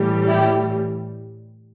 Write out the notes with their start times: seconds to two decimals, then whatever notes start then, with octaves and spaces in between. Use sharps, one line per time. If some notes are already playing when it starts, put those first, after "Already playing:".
Already playing: A2 E3 G3
0.28 E4 G4